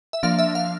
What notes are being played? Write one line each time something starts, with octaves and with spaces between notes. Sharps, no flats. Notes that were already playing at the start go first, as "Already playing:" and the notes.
E5
F3 A#3 D4 F5
E5
F5